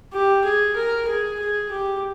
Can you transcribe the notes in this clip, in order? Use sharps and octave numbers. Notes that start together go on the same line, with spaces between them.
G4
G#4
A#4
G#4
G#4
G4